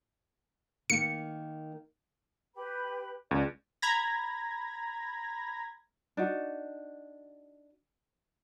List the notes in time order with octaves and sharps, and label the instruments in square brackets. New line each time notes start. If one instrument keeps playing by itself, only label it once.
[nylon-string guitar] D#3 A#3 [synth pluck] C#7
[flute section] G4 B4 B5
[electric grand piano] C#2 [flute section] D5 G#5
[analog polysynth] A#5 B5 G#6 A#6
[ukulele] D4 D#4 F#4